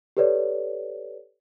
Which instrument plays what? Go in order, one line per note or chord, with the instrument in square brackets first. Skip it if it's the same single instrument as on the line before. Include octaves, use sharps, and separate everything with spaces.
[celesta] G4 A4 B4 C#5 D5